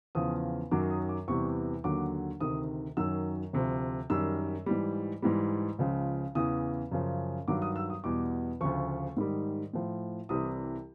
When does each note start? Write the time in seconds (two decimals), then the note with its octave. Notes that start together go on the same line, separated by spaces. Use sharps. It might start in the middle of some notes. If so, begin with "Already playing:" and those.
0.15 E2 C#3 F3 D#6
0.71 F#2 D#3 F#3 D6
0.90 D#6
1.09 D6
1.28 E2 C3 E3 G3 C#6
1.84 D#2 D3 F#3 D6
2.41 D2 C3 D#3 D#6
2.97 F#2 D#3 F#3 E6
3.53 D2 C3 F3
4.10 F#2 D#3 G3 E6
4.66 G#2 E3 G3
5.22 G#2 E3 G3
5.79 C#2 C#3 F3
6.35 E2 C#3 E3 D#6
6.91 F#2 C#3 F3
7.48 G2 D#3 F#3 D6
7.62 D#6
7.76 E6
7.90 D#6
8.04 E2 B2 G3 D6
8.61 D2 C#3 F3 C#6
9.17 G#2 D#3 G3
9.73 A2 F3
10.29 C2 C3 E3 G3 D#6